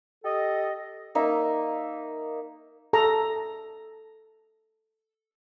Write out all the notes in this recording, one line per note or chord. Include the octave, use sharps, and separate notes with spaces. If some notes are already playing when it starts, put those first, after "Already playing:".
G4 A4 D#5
A#3 D#4 E5
A4 A#5